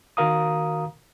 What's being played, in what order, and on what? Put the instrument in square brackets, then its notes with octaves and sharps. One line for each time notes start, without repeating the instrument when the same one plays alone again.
[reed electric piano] D#3 F#4 A#4 F5 A#5 D#6